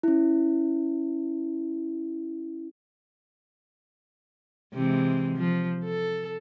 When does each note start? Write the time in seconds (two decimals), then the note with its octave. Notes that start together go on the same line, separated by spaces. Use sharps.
0.03 C#4 E4
4.74 C3 E3 G#3
5.37 F3
5.84 A4